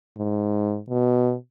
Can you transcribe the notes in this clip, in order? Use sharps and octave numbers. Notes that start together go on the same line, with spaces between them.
G#2
B2